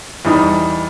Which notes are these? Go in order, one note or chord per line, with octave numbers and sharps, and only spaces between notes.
E2 G3 D#4 D#6